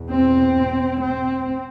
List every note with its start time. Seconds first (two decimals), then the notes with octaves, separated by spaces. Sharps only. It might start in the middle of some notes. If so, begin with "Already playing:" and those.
Already playing: E2 B2
0.10 C4
1.04 C4